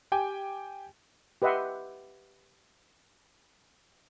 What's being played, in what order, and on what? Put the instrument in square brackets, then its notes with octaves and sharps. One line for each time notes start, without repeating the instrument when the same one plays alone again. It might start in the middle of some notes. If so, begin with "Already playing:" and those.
[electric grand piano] G4 G5 G#5 D6
[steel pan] G4 B4 D#5 E5 F#5 C6